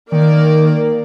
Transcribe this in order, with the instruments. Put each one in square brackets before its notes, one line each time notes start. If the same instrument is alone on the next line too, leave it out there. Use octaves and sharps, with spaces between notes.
[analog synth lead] D#3 [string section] A#3 D5